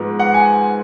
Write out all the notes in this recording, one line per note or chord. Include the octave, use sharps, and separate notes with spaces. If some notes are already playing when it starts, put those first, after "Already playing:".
Already playing: G#2 F3 G#3 B3
F#5
G#5